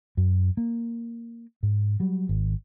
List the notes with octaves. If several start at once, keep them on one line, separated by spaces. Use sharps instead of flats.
F#2
A#3
G#2
F#3 G3
G#1